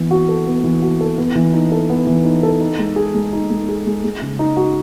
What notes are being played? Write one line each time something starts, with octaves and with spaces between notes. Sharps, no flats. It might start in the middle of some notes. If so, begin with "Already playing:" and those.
Already playing: E3 B3
F#4
A4
B3
E3
F#4
A4
B3
E3
D#4
A4
B3
E3
D#4
A4
D#4
G#3
G#4
G#3
D#4
G#3
G#4
G#3
G#3
C#3
D#4
F#4